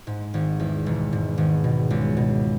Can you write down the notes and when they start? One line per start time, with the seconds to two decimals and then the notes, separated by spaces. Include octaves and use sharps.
0.07 G#2
0.34 G#1
0.59 E2
0.86 E1
1.13 G#2
1.38 G#1
1.64 B2
1.90 C#2
2.17 B2